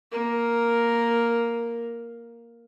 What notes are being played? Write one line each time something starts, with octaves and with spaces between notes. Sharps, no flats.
A#3 A#4